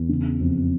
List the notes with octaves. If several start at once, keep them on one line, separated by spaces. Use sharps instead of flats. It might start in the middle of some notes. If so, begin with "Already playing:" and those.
Already playing: E2
C#3
F2